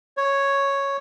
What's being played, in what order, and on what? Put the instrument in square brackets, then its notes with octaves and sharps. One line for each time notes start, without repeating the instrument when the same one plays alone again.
[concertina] C#5